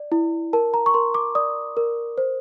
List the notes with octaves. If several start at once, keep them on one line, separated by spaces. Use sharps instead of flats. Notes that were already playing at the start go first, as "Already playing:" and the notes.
Already playing: D5
E4
A#4 A5
A#5
C#6
A#4 C6
D6
D5 D#6
A#4
C5